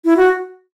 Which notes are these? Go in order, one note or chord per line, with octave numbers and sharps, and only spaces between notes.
E4
F#4